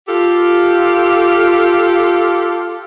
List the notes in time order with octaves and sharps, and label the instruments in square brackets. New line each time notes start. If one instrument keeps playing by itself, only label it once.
[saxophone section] F4 G4 A4